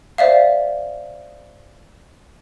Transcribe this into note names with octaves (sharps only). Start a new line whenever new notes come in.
C5 D5 E5 F5